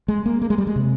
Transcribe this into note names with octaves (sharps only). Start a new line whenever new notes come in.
G#3
A#3
A#3
G#3
G3
G#3
C3